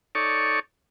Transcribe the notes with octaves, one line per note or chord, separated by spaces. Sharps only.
D#4 A4 C#5 D5 C#6